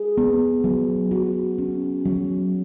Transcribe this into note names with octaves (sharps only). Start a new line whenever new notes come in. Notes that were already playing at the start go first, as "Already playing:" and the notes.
Already playing: G#4
B3
F#3
F#4
C#4
F#3